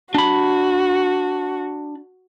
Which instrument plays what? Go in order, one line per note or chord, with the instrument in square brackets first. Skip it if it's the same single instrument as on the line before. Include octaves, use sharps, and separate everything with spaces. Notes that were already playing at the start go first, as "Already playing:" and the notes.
[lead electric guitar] D4 B5 [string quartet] F#4